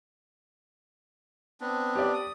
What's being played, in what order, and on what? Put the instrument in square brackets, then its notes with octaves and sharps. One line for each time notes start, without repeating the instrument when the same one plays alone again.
[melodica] B3 C4 D4
[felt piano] G4 D5
[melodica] D#6